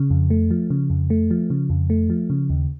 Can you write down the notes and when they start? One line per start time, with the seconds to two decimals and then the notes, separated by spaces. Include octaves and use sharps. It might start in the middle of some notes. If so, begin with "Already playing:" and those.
Already playing: C#3
0.10 F2
0.30 A3
0.51 F3
0.70 C#3
0.90 F2
1.10 A3
1.31 F3
1.50 C#3
1.70 F2
1.90 A3
2.10 F3
2.30 C#3
2.50 D#2